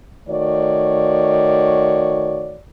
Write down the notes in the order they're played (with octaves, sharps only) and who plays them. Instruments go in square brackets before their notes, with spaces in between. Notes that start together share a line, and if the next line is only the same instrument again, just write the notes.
[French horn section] D#3 A3 F#4 C#5 D5